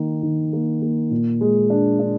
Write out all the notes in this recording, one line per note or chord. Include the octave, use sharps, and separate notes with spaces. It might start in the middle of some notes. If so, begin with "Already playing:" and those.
Already playing: D#3 A#3 D#4
D#3
A#3
A#3
A#2
G#3
D4
D4